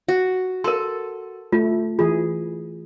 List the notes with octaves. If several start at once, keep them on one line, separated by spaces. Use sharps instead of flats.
F#4
A4 A#4 C6
A3 F4
E3 F4 G#4